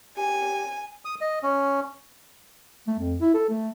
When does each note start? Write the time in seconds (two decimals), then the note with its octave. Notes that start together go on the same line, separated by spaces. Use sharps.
0.17 G4 G#5
1.05 D#6
1.21 D#5
1.43 C#4
2.87 A3
2.99 F2
3.21 E4
3.34 A4
3.49 A3